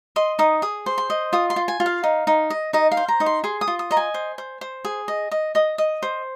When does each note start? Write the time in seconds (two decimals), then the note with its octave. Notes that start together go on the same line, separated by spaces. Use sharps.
0.16 D#5 C6
0.39 D#4 D#6
0.62 G#4 D#6
0.86 C5
0.98 C6
1.10 D#5
1.33 F4 D#6
1.50 C6
1.56 F4
1.68 G#5
1.80 F4
1.86 F5
2.04 D#4
2.27 D#4
2.50 D#5
2.73 D#4 D#5
2.91 F5
2.97 C5
3.08 A#5
3.20 D#4 D#6
3.26 C6
3.44 G#4 C6
3.61 D#6
3.68 F4
3.79 D#6
3.91 D#5 A#5
3.97 G#5
4.14 C5
4.38 C5
4.61 C5
4.85 G#4
5.08 D#5
5.32 D#5
5.55 D#5 D#6
5.78 D#5
6.03 C5